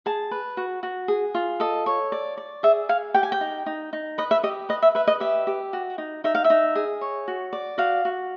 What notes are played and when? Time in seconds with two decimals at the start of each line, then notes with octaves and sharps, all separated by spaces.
0.06 G#4 A5
0.31 B4
0.57 F#4
0.83 F#4
1.08 G#4
1.34 F4
1.60 A4 D#5
1.86 C#5
2.12 D5
2.37 D5
2.63 G#4 E5
2.89 G#4 F5
3.14 G4 G5
3.23 G#5
3.32 G5
3.41 D#4
3.66 D#4
3.93 D#4
4.18 B4 D#5
4.31 E5
4.43 G4 D#5
4.69 B4 D#5
4.82 E5
4.95 B4 E5
5.07 D#5
5.20 G4 E5
5.47 G4
5.73 F#4
5.98 D#4
6.24 D#4 E5
6.35 F5
6.44 E5
6.50 D#4
6.75 G#4
7.01 C#5
7.28 F#4
7.53 D5
7.78 F#4 F5
8.05 F#4